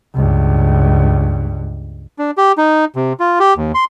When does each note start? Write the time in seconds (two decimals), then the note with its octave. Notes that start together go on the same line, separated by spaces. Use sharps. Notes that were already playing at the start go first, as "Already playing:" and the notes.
0.15 C#2 G2
2.19 D4
2.38 G4
2.58 D#4
2.96 C3
3.20 F4
3.40 G4
3.57 D#2
3.74 C6